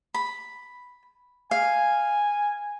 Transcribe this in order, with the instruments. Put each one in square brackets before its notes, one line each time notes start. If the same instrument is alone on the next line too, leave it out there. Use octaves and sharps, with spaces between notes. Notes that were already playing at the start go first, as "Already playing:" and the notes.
[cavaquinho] B5
[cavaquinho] F5 [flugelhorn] G#5